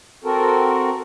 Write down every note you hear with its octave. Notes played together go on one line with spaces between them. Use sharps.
C4 F#4 A4 A#4